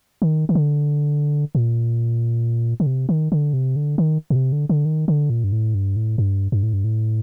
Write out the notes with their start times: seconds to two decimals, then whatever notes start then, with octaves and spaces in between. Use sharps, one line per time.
0.22 D#3
0.49 D#3
0.55 D3
1.55 A#2
2.80 D3
2.86 C3
3.09 D#3
3.32 D3
3.53 C3
3.76 D3
3.98 D#3
4.30 A#2
4.36 C3
4.52 D3
4.69 D3
4.85 D#3
5.08 D3
5.30 A#2
5.44 G2
5.52 A2
5.75 G2
5.96 A2
6.18 G2
6.52 G2
6.63 A2
6.73 G2
6.84 A2